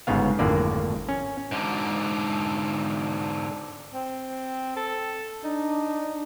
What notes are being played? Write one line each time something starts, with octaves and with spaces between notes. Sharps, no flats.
G1 G#2 C#3 B3 F5
G#1 F2 A2 D3 A#3 D5
C#4
G#2 D3
C4
A4
D4 D#4